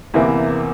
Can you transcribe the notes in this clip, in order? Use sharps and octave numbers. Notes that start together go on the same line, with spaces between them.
E2 C3 E3 A#3